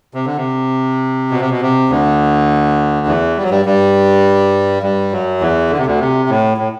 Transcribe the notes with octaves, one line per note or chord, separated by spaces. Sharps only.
C3
D3
C3
B2
C3
B2
C3
D2 D3
E2 E3
G3
F#3
G2 G3
G2 G3
G2 G3
F#2 F#3
E2 E3
D3
C3
D2 D3
C3
A2
A2